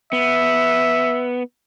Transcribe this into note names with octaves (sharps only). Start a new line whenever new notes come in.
B3 E5